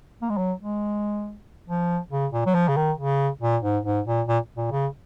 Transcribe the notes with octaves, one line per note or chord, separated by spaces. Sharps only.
A#3
G#3
F#3
G#3
F3
C#3
A#2
F#3
F3
C#3
D#3
C#3
A#2
G#2
G#2
A#2
A#2
A#2
C#3